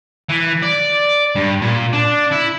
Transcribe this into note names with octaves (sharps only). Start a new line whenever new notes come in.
E3
D5
G2
A#2
D4
E4